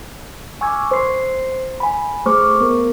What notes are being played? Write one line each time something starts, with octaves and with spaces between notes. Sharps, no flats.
G#5 C#6 D6 E6 F6 G#6
C5 C6 C7
G#5 B5
A3 G#4 C5 C#6 D6 F6
B3 A#4